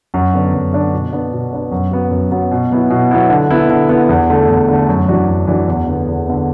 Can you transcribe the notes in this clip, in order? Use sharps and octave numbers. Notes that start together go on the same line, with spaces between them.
F#2
D3 B3 D4
F#2
D3 B3 D4
B2
B3 D4
B2
B3 D4
F#2
F#3 B3
F#2
F#3 B3
B2
F#3 B3 E4
B2
F#3 B3 E4
D3
B3 E4
D3
B3 E4
E2
D3 A3
E2
D3 A3
F#2
E3 D4 F#4
F#2
E3 D4 F#4
E2
D3 B3
E2
D3 B3